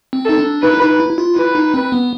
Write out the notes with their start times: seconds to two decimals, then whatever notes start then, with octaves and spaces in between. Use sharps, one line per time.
0.13 C4
0.25 D#4 A4
0.38 D4
0.62 D#4 B4
0.73 E4
0.81 D#4
1.00 E4
1.10 E4
1.18 F4
1.36 E4 B4
1.55 D#4
1.74 C4
1.92 B3